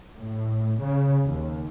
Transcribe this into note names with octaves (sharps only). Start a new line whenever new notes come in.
A2
C#3
D#2